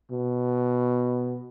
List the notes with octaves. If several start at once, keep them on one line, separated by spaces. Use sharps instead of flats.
B2